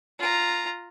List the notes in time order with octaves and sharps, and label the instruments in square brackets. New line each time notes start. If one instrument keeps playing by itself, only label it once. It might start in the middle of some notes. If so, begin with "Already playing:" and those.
[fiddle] F4 A#5